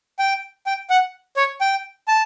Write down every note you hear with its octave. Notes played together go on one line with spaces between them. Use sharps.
G5
G5
F#5
C#5
G5
A5